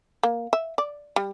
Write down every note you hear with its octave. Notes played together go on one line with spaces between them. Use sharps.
A#3
E5
D5
G3